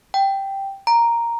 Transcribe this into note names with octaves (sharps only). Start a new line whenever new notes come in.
G5
A#5